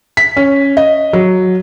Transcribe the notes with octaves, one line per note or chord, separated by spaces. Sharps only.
B6
C#4
D#5
F#3